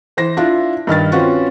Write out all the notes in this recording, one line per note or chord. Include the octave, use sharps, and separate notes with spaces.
E3 C5 A#6
D4 E4 F4
G2 D#3 F6 A6
C4 C#4 F4 F#4 B4